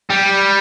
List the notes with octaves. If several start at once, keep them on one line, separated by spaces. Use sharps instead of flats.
G3